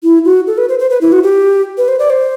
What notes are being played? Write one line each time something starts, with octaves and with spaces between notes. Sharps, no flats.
E4
F#4
A4
B4
C5
C5
B4
E4
F#4
G4
B4
C5
D5
C5